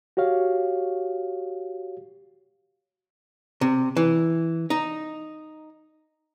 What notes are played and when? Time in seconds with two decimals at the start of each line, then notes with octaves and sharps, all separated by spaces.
0.17 F#4 G4 C#5 F5
3.61 C3
3.97 E3
4.70 D#4